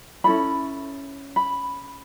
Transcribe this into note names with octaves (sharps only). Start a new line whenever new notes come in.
C#4 E4 A4 B5
B5